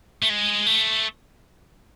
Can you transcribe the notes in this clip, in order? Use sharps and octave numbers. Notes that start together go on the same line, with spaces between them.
A3
G#3
A3